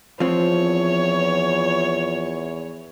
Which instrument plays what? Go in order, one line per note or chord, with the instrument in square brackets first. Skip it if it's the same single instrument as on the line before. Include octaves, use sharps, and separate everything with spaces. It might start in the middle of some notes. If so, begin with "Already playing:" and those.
[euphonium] E2 [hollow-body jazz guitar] F3 C4 [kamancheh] C#5